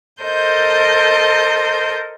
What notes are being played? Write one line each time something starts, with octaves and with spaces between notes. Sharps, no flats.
A4 A#4 C5 D#5 G6